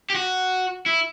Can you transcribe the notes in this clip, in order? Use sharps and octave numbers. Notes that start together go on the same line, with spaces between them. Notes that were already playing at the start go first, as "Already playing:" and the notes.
G4
F#4
E4